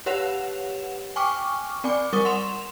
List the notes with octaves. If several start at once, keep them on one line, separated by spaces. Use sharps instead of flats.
G4 B4 C#5 F#5 E7 F7
G5 G#5 C#6 D6 F6
C4 D5 G#5 D6
G3 A#4 C#6 D#6 G7
F#5 C6 E7 F7